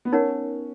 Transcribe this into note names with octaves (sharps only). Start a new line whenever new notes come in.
B3
C#4 D#4 A#4 C#5 F#5